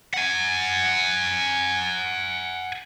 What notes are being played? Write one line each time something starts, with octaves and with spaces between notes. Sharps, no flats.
F#5 G#5